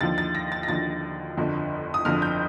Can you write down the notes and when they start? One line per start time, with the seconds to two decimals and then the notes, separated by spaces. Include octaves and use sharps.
0.01 D#2 D3 F3 A6
0.18 A6
0.35 A#6
0.52 A6
0.63 A#6
0.68 D#2 D3 F3 A6
1.37 G1 F2 D3 F3
1.94 D#6
2.05 G1 F2 D3 F3 F6
2.22 G6